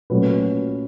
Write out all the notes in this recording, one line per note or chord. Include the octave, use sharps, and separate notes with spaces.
A#2 F#3 A3 C#4 B4